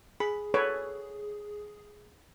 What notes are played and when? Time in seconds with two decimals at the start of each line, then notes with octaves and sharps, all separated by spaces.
0.20 G#4 B5
0.54 A4 B4 C#5